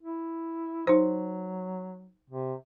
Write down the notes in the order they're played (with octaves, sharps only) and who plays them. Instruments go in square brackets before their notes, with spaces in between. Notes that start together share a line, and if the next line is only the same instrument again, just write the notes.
[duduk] E4
[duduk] F#3 [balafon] D#4 C5
[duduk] C3